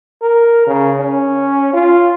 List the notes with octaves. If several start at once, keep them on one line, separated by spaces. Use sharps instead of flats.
A#4
C#3
C#4
F4